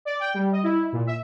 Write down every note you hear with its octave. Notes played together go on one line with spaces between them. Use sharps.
D5
G5
G3
D#5
E4
A#2
E5